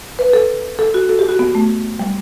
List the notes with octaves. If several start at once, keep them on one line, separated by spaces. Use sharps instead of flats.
B4
A4
A4
F#4
A4
G4
F#4
B3
A3
G3